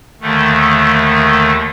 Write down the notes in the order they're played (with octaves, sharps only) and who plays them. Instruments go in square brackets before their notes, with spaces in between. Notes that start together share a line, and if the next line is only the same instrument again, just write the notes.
[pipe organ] D#2 D3 D#3 A3